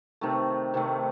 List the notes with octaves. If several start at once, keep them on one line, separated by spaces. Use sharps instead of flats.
C3 D#3 A3
C3 D#3 A3